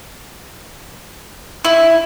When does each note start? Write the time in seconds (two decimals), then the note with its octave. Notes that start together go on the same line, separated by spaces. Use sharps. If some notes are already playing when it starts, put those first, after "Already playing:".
1.65 E4